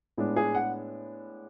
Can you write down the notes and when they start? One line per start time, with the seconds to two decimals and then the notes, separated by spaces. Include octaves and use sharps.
0.17 A2 G#3 B3 D4
0.36 G#4
0.55 F#5